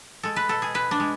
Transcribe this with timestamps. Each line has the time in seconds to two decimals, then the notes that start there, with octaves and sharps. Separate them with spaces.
0.23 G#3 A4
0.36 B4
0.49 B2 A4
0.62 G#4
0.74 B2 B4
0.91 D4
1.00 G#3